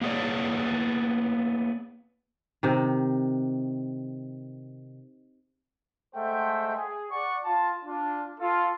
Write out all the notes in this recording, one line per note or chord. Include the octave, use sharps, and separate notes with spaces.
A#3 B3 E4 G#4 C#5 D5
C3 D#3
G#3 A3 C5 E5 F#5 G5
G#4
D5 F#5 C#6
F4 A5
D4 F4
F4 A4